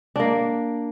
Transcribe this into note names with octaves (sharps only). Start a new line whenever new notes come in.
A#3 D4